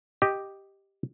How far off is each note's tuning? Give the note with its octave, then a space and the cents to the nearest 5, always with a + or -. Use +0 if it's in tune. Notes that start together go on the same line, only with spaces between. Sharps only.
G4 +0 D#5 +0